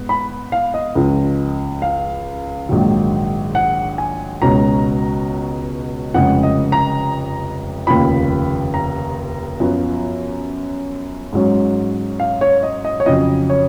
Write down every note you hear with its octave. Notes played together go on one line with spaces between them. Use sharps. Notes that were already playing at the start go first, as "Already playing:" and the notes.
Already playing: G#2 B3
B5
F5
D#5
C#2 C#3 F3
F5
A#1 G#2 D#3 F#3
F#5
G#5
C#2 B2 G#3 C#4 A#5
F1 F2 C#3 G#3 F#5
D#5
A#5
F1 D#2 C#3 F3 B5
A#5
F#2 F3 B3
G#2 F#3 C#4
F5
C#5
D#5
D#5
C#5
F2 C#3 F#3 D#5
C#5